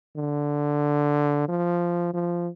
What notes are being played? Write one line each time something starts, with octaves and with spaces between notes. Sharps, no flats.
D3
F3
F3